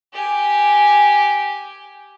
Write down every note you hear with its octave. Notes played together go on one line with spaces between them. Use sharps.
G4 G#5